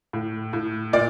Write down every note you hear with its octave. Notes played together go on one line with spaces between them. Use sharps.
A2
A2
A#2 D5